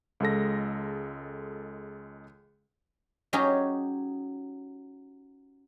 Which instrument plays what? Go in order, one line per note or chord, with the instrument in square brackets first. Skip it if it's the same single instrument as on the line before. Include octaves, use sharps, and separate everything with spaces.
[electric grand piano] C#2 G#3 A4 A#6
[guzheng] F#3 C#4 D#4 G4 G#4